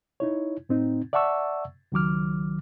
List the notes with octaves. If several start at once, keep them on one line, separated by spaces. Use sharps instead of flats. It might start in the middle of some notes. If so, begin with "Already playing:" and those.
D#4 E4 C#5
A2 C4 D#4
D5 E5 F#5 A5 C#6 E6
C#2 D#3 F#3 D6 F6